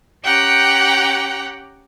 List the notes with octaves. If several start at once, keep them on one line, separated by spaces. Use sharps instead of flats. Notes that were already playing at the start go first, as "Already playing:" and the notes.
C#4 G4 F#5 G5 A#5